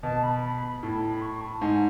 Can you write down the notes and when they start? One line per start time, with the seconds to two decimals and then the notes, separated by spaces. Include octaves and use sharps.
0.03 B2 A5
0.23 B5
0.83 A2 A5
1.02 B5
1.22 C#6
1.41 A5
1.61 G#2 G#5